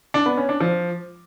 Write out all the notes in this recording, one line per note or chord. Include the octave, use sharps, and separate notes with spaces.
D4
B3
C#4
D4
F3